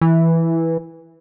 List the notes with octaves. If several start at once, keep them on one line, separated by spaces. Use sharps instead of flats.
E3